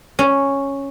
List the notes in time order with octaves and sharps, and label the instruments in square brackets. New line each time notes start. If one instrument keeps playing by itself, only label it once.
[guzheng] C#4